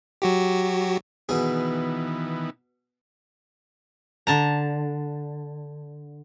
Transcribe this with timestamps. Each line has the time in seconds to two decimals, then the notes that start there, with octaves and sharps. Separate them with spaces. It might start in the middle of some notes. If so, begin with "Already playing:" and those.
0.22 F#3 F#4 G4
1.29 B2 D#3 E3 B3 G#4
4.27 D3 A5 A#5